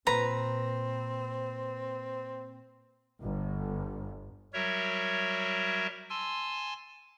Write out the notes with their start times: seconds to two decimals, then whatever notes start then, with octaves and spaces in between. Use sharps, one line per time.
0.07 A#2 C4 B4 A#5
3.21 G1
4.54 F#3 G3 F#4 A#4 C#5 E5
6.10 G#5 A5 C6 E6